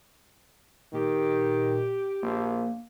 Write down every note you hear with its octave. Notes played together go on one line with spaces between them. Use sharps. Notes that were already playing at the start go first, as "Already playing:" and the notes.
A#2 D#3 G4
A#1 A#3